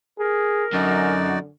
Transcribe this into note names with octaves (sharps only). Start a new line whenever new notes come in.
G#4 A#4
F#2 D3 D#4 F#4 D5